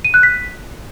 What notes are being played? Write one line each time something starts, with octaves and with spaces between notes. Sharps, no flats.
D#7
F#6
B6